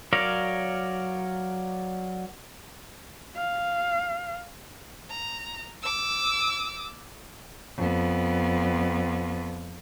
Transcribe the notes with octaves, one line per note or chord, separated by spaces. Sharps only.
F#3 A#4 C#5 D5 F5
F5
A#5
D6 E6
F2 B3